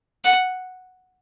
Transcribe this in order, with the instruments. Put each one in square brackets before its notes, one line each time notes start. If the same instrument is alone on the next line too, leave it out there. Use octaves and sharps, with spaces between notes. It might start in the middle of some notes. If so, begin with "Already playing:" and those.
[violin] F#5